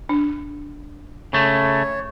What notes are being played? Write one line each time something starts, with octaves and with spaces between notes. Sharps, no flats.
D4
C#3 A3 C#5